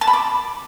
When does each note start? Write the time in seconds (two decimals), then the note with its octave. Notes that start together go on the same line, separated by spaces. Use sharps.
0.01 A5
0.07 B5
0.13 D6